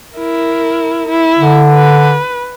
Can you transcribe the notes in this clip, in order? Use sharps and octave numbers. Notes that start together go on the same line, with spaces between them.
E4 A#4
E4
D3
B4